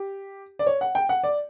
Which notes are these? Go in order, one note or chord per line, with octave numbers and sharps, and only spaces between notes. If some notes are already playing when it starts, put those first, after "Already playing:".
Already playing: G4
D5
C#5
F#5
G5
F#5
D5